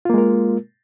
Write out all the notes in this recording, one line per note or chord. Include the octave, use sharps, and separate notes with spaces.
G#3 A#3 F4 A#4